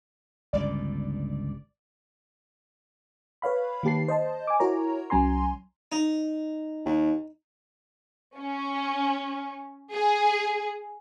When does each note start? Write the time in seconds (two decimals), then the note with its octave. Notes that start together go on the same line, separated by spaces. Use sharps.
0.53 G1 C#2 G2 D5
3.42 B4 C#5 F5 B5
3.83 D#3 A#3 G4 A5 C7
4.08 C5 D#5 A5
4.47 G#5 D6
4.60 E4 F#4 A#4 C#5 A#5
5.10 C2 F#3 C#4 G#5 A#5 C6
5.92 D#4
6.86 D#2
8.37 C#4
9.91 G#4